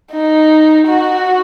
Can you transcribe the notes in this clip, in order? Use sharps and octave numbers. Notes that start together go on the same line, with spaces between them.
D#4
F#4